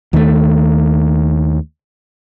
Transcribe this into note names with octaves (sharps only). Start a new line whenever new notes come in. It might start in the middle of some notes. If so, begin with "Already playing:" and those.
D#2 D#3 A3